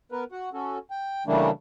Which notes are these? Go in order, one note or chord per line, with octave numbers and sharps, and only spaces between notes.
B3 A#4 B4
F#4 F#5
C#4 F#4 A4
G5
C#3 E3 G3 A3 A#3 D4